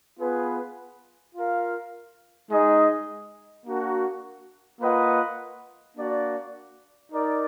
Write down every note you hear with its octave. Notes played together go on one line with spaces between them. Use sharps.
B3 F4 G#4 B4
F4 A#4 F5
G#3 D#4 G#4 D#5
A#3 D4 F#4 A#4
A#3 F4 B4 D#5 F#5
A#3 D4 F#4 D5
D#4 A#4 D5